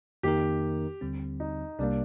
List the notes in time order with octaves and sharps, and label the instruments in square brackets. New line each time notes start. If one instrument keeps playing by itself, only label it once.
[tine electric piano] F2 D#3 A#3 D#4 A#4 [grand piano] G4
[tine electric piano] D#2 D3 G3 C4
[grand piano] D#4
[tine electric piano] C2 C3 G3 A#3 [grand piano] D4